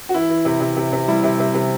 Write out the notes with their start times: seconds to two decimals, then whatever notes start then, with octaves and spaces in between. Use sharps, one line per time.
0.09 F#4
0.14 E3 E4
0.30 E3
0.45 C3
0.61 C3
0.77 C3
0.92 C3
1.08 G3 E4
1.24 C3
1.39 C3
1.54 C3